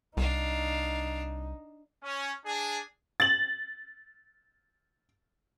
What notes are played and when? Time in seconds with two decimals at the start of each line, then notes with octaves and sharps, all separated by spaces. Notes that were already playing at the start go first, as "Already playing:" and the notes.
0.17 C2 D4 D#4 F5
2.03 C#4
2.44 D4 G#4
3.20 A6 F#7